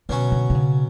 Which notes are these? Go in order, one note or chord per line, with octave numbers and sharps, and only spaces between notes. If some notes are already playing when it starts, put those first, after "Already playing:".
B2 D3 F#3 C#4 F#4
D3
D3
C#3